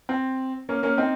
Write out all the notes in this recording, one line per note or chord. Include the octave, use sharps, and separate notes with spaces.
C4
A#3 C#4
A#3 C#4
C4 D#4